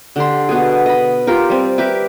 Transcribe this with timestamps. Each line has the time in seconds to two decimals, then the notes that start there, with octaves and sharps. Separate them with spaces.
0.16 D3 G4 C6
0.49 B2 B3 G#4
0.86 D#5 B5
1.27 F4 G4 A#4
1.50 G3 C4
1.78 G4 A#4 B4 E5